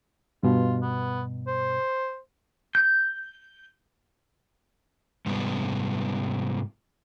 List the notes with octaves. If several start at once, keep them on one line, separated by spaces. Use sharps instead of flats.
G2 B2 F4
B3
C5
G6
G#2 C3 G3 B3